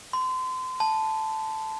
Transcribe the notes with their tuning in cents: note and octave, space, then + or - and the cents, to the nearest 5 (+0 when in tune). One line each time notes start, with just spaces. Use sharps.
C6 -30
A5 -5